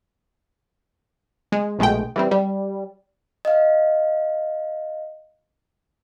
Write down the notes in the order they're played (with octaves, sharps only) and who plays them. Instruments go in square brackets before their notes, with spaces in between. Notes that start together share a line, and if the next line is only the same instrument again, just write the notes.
[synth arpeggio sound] G#3
A#1 B2 G#3 A3 G5
E3 G3 C4
G3
[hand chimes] D#5 F5